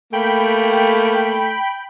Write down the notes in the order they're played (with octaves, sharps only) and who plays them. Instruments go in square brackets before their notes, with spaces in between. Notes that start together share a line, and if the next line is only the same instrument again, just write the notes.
[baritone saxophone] A3 [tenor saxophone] A#3 [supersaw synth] G5 B5